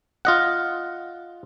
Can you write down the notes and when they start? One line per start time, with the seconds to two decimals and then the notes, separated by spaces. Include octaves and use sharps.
0.25 F4 D#5 F#5